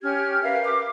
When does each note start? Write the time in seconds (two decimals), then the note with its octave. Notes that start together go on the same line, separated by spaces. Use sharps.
0.02 C#4 G4 F6 G#6
0.42 A#4 B4 E5 F5
0.64 D6